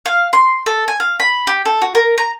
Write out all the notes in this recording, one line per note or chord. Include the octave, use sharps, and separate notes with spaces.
F5
C6
A4
G#5
F5
B5
G4
A4
F#4
A#4
A#5